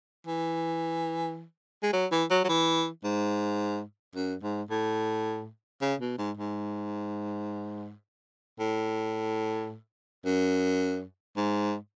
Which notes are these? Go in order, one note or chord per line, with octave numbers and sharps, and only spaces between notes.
E3
G#3
F#3
E3
F#3
F#3
E3
G#2
F#2
G#2
A2
C#3
B2
G#2
G#2
A2
F#2
G#2